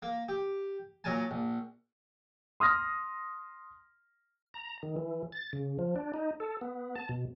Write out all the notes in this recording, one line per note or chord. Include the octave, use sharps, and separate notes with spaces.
A#3
G4
A#2 F#3 A#4 G#5 A5
A#1
C6 D#6 F6 A#6
A#5
D#3
E3
A6
C#3
F3
D4
D#4
A4
B3
A5
B2